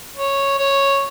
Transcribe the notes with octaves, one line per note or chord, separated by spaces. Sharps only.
C#5
C#5